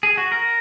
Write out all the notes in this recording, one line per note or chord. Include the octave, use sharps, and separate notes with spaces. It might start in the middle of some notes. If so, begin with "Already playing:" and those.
G#4
F#4
A#4